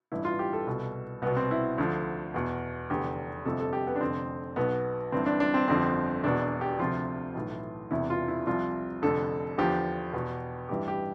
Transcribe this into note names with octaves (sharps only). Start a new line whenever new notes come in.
A1 G2 E3 E4
F4
G4
A4
C2 B2
C2 B2 B3
C4
E4
D2 D3 F3
E2 B2
F1 E2 D3 G4
G1 F2 C3 F3 A4
A4
G4
B3
D4
F1 F2 D3 C4
B1 B2 B3
G1 G2 E3 C4
D4
D4
C4
G1 F2 D3 F3 C4
E1 E2 B2 D4
G4
D2 C3 F3 F4
B1 A2 E3
E1 E2 C3 E3 E4
F4
E4
C2 C3 F3 F4
F1 F2 D3 A4
E2 D3 F3 G4
E2 B2
A1 G2 E3 G4
G4